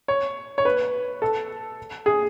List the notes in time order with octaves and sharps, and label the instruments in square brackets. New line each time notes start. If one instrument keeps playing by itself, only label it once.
[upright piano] C#5
C#5
B4
A4
G#4